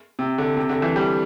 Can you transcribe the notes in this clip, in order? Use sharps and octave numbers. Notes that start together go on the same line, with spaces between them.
C3
D3
C3
D3
E3
G3